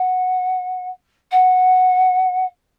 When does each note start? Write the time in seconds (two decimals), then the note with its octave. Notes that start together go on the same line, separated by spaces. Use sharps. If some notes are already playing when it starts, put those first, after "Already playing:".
Already playing: F#5
1.31 F#5